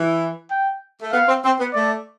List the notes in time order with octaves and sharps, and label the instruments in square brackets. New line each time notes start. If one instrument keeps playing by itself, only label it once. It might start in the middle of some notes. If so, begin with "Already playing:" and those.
Already playing: [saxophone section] E3
[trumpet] G5
[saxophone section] A3
[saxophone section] B3 [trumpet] F5
[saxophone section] C4
C4
B3
[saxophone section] A3 [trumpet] D5